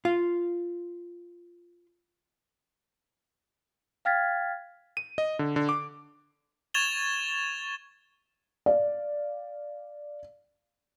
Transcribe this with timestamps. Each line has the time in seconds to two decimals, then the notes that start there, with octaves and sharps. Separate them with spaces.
0.05 F4 F5
4.05 F5 G5 F6 G#6 A6 B6
4.97 D#7
5.18 D#5
5.39 D3
5.56 D3
5.69 D6
6.74 C#6 G#6 A6 E7 F7 G7
8.66 D5 F5